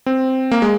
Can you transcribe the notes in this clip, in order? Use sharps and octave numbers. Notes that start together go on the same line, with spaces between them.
C4
A#3
G#3